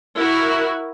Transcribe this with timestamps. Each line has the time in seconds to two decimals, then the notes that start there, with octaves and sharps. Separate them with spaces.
0.17 E4 F#4 A#4